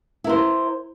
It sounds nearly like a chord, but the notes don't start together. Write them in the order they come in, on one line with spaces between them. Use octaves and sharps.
E4 A#4 C5